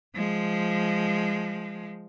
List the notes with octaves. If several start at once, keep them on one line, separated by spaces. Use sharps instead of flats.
F3 G#3